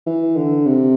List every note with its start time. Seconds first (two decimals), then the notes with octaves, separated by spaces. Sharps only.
0.07 E3
0.36 D3
0.66 C3